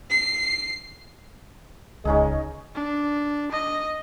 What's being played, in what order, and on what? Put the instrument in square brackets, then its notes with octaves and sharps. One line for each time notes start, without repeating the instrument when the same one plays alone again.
[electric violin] C7
[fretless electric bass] D1 C#2 [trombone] G#3 [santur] C#4 D#4 G#4
[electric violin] D4
D#5